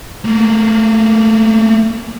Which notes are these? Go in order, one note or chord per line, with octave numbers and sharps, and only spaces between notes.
A3 A#3